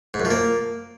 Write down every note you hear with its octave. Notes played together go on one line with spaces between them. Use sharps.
G#2
F#2
F3
A#3